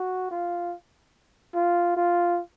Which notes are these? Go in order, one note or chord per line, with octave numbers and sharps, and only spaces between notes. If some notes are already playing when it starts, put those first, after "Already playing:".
Already playing: F#4
F4
F4
F4